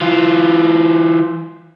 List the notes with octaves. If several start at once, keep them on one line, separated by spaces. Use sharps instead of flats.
E3 F4